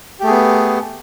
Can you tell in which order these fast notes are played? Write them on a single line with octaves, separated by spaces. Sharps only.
G4 A3 G#4 B3